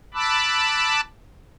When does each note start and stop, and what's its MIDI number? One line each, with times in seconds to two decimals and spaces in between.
0.14 1.01 81
0.14 1.01 83
0.14 1.01 86
0.14 1.01 88
0.14 1.01 90